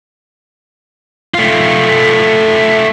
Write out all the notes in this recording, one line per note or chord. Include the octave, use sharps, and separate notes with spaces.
A3 F4